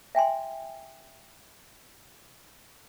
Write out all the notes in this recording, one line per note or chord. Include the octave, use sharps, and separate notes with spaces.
E5 G5 G#5 C6